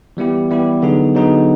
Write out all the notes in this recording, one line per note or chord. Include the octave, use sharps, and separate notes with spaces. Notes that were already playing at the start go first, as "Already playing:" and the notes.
E3 G3 B3 E4 G4
E3 G3 B3 E4 G4
D3 F#3 B3 D#4 G#4
D3 F#3 B3 D#4 G#4